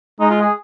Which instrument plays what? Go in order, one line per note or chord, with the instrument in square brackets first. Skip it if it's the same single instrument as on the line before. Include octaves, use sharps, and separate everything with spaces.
[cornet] G#3 [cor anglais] D#4
[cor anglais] F4
G#4